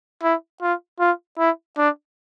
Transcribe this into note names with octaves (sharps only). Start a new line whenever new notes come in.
E4
F4
F4
E4
D4